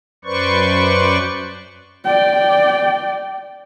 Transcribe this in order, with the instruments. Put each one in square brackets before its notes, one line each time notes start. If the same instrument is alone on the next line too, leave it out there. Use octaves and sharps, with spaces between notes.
[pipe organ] F#2 B4 C5 D5 C#6
[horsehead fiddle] D5 G5